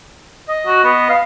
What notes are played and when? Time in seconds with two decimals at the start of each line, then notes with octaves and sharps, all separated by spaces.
0.48 D#5
0.67 F#4
0.84 B3
1.10 F5